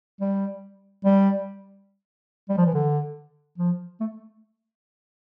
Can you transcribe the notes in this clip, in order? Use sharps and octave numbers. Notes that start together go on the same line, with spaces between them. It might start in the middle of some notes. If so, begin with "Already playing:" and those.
G3
G3
G3
F3
E3
D3
F3
A3